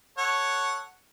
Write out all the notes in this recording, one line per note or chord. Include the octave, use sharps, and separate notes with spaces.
A4 C#5 F#5